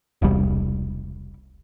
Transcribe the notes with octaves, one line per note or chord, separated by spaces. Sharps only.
E1 C2 G3